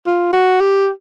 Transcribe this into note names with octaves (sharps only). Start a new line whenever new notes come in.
F4
F#4
G4